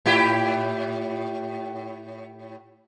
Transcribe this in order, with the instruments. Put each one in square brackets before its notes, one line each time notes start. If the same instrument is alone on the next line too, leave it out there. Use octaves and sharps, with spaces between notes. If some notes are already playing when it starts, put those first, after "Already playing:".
[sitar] A2 E4 G4